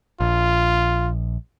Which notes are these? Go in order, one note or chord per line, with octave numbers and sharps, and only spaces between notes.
A#1 F4